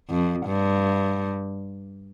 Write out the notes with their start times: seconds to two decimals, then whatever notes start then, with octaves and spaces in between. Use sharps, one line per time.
0.10 F2
0.46 G2